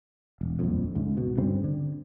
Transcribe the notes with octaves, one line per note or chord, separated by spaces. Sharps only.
E1
D#1 A#1 F2
C#2 G#2
B2
D2 G2 C#3 C4
D3